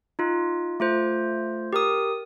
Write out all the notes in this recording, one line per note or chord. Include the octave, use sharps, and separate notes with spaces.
D#4 F4
A3 F4 C5
G4 A#4 D#6